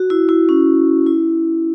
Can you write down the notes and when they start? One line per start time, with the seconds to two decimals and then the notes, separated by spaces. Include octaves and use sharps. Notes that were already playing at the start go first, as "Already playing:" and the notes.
Already playing: F#4
0.10 E4
0.29 E4
0.49 C#4
1.07 E4